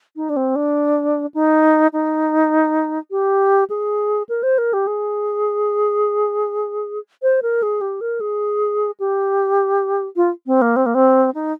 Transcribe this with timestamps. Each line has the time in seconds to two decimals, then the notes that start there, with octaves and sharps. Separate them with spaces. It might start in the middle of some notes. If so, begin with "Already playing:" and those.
0.16 D#4
0.29 D4
0.36 C4
0.56 D4
1.34 D#4
1.93 D#4
3.11 G4
3.70 G#4
4.29 A#4
4.43 C5
4.58 A#4
4.73 G4
4.87 G#4
7.23 C5
7.42 A#4
7.63 G#4
7.81 G4
8.01 A#4
8.20 G#4
9.00 G4
10.16 F4
10.46 C4
10.62 A#3
10.76 C4
10.86 A#3
10.95 C4
11.35 D#4